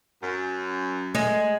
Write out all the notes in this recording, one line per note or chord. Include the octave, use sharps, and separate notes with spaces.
F#2
G#3 A3